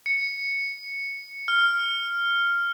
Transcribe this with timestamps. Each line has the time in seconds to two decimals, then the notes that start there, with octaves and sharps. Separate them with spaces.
0.06 C#7
1.48 F6